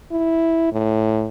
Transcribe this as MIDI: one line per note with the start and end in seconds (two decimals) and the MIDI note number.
0.12 0.72 64
0.72 1.29 45